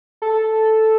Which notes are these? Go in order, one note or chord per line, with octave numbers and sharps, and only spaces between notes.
A4